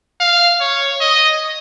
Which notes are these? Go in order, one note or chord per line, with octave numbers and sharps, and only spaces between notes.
F5
C#5
D#5